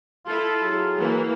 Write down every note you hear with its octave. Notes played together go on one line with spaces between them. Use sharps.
E4 F4 A4
F#3 G#4
E3 A#3